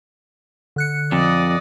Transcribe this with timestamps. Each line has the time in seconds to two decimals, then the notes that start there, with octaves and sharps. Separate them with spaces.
0.76 D3 F#6 C#7
1.12 F2 D5 D#5